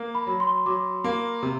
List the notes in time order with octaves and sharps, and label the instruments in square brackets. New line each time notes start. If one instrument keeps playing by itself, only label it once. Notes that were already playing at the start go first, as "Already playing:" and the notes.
Already playing: [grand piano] A#3
[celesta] B5
[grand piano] F#3
[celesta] C6
[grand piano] F#3 [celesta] D6
[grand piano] A#3
C3